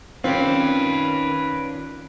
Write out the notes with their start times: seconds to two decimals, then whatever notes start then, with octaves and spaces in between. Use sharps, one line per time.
0.24 D#3 C4 C#4 F4 B4 D5